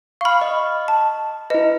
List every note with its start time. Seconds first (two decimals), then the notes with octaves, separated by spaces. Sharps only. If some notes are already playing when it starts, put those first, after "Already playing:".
0.21 F5 B5 C#6 F6
0.41 D#5
0.88 A5
1.50 E4 B4 D#5